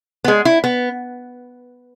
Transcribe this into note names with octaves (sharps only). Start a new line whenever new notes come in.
B3
G#3
E4
B3